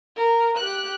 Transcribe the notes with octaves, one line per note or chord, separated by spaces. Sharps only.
A#4
G4 F#6